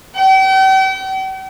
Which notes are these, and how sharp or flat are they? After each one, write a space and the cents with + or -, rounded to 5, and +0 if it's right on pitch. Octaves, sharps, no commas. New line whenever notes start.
G5 -40